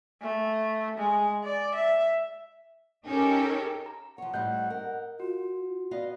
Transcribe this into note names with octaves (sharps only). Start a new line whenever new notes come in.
A3
G#3
D5
E5
C#4 D#4 G4 A4 A#4
A#5
F3 C#5 F#5
A2 G3 C4 D#5 F#6 G6
A#4
F4 F#4
B3 D5 D#5 F5